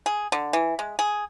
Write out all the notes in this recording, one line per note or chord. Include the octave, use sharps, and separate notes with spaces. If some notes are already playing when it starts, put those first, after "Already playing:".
G#4
D3
E3
G#3
G#4